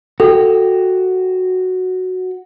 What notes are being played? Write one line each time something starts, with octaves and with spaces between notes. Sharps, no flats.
F#4 A4 G5